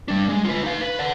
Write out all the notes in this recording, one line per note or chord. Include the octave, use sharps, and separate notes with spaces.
G3 D4
G#3
F4 B4
D#4 F5
B4
D5 F#5